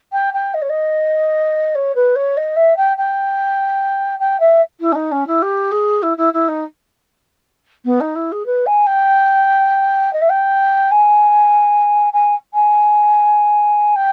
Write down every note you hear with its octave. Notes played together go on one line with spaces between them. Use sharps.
G5
G5
D#5
C#5
D#5
C#5
B4
C#5
D#5
E5
G5
G5
G5
E5
E4
C#4
D#4
C#4
E4
G4
G#4
E4
E4
E4
D#4
B3
D#4
E4
G#4
B4
G#5
G5
D#5
E5
G5
G#5
G#5
G#5
G5